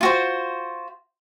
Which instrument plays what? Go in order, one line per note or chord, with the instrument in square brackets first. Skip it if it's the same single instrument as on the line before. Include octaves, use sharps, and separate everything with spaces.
[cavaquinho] F4 F#4 C5